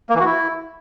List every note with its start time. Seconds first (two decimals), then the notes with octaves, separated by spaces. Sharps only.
0.10 A#3
0.15 E3
0.20 F#4
0.25 E4